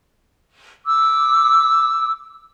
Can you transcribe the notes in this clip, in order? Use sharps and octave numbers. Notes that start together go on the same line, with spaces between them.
D6 E6